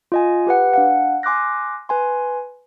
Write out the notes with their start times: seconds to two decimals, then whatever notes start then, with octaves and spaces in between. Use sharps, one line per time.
0.12 F4 D#5 G#5
0.47 G4 B4 F#5
0.73 D4 F5 F#5
1.23 G#5 C6 D6 F6 F#6 A#6
1.89 B4 G#5 C6